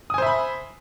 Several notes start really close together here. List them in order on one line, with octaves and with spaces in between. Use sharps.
D#6 G#5 C5 E5 B5